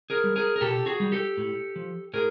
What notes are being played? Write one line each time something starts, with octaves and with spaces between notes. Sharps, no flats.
G#4 A#4
G3
G#4 A#4
A#4
B2 G4 A4
F#4 G#4
G3
G4 A4
A2
F3
A2 G#4 A#4